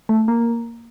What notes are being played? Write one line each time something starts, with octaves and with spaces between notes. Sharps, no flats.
A3
A#3